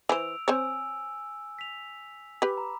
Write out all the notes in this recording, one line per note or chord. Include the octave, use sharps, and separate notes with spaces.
E3 C5 E6 D7 F7
C4 C5 C#5 G#5 E6
B6 F7
G4 B4 B5 D6
A#5